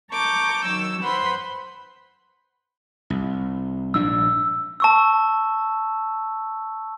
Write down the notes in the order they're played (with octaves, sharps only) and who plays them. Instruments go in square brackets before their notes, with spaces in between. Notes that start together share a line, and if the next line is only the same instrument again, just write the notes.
[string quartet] A5 A#5 C#6 D6 G6
D#3 F#3 E6
B4 C5 F#5 B5 C6
[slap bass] C2
[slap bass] A#1 G#2 D4 [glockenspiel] E6
[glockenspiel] A5 C#6 E6